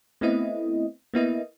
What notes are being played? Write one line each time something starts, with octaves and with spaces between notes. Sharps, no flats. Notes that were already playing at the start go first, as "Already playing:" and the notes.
A3 B3 C4 E4 D#5
A#3 B3 E4 D#5